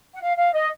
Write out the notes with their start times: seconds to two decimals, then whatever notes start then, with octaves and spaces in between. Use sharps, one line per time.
0.14 F#5
0.22 F5
0.37 F5
0.54 D#5